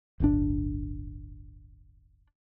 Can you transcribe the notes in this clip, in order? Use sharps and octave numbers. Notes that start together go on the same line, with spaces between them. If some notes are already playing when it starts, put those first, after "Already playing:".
D1 G1 C4 D4